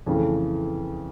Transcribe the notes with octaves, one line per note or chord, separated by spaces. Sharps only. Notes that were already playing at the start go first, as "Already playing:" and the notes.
F2 C#3 E3 A3